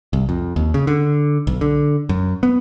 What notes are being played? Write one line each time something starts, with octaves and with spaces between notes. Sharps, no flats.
C2
F2
D#2
C#3
D3
B1
D3
F#2
B3